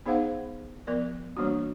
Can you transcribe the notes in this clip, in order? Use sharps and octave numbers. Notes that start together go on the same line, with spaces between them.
B3 D#4 G#4 C5 F5 F#5
F3 B3 A#4 D5
E3 G3 A#3 D4 F#4